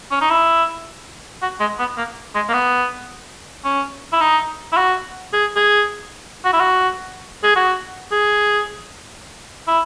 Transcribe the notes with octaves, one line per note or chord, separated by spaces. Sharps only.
C#4
D#4
E4
F#4
G#3
B3
A#3
G#3
A#3
B3
C#4
E4
D#4
E4
F#4
G#4
G#4
F#4
E4
F#4
G#4
F#4
G#4
E4